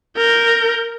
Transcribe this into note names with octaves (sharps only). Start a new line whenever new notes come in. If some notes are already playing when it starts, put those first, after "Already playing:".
A#4 G6